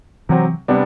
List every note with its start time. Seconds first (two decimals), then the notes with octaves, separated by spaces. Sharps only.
0.29 C3 E3 F#3 C4
0.68 C3 G3 B3 D4